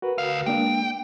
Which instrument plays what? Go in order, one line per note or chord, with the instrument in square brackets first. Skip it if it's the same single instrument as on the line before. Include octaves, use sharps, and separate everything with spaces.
[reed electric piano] F#4 A#4 B4
[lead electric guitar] D2 F5
[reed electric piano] G#3 A#3 D4 [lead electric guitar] G5